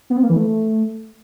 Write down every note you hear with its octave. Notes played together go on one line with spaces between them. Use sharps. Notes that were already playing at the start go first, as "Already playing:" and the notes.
B3
C4
A#3
E3
A3